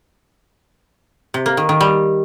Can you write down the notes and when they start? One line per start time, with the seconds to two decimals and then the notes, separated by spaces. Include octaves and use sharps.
1.34 C3
1.46 A#3
1.57 D#3
1.69 D#3
1.81 G3